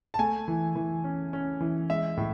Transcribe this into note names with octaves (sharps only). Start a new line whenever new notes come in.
A5
A3 G#5
E3
E3
C#4
C#4
E3
G#3 E5
A2